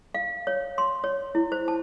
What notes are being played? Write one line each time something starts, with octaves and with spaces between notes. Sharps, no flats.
F5
C#5
C6
C#5
E4
C5
A5